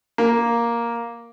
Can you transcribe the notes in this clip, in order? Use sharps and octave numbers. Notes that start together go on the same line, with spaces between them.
A#3